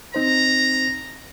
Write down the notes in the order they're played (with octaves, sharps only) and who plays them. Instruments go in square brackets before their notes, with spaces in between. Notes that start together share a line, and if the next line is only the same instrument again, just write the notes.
[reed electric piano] C4 D#4 C5 [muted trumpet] A#5